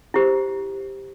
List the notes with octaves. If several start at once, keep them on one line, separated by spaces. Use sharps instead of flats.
E4 G4 C5